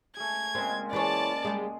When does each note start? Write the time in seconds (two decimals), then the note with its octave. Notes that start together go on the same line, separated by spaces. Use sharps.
0.17 A3 G#4 G#6
0.55 A#2 C#3 G#3 C4
0.93 E3 G#4 C#5 D5 A5
1.45 G3 G#3 G#4